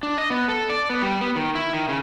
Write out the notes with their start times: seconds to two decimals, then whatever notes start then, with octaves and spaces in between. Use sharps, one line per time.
0.03 D4
0.18 D#5
0.30 B3
0.48 A4
0.70 D5
0.90 B3
1.02 G3
1.21 B3
1.36 D#3
1.55 E4
1.73 D#3
1.89 C#3